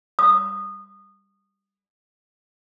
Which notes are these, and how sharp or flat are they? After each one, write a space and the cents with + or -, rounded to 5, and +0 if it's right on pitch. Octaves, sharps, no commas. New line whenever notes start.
D#6 -20